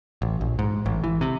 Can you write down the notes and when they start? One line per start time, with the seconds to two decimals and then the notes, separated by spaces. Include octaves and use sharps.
0.22 A1
0.41 A#1
0.59 G#2
0.86 A1
1.04 E3
1.21 C3